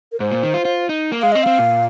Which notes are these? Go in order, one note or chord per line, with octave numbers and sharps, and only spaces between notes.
A#4
G#2 C5
A#2
D#3
F4
F4
D#4
A#3
G#3 F5
C4 D#5
C4 F5
A#2